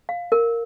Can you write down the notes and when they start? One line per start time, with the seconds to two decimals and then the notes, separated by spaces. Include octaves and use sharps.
0.09 F5
0.32 A#4